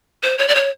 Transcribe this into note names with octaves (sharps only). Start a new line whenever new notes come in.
C5
C#5
D5
C#5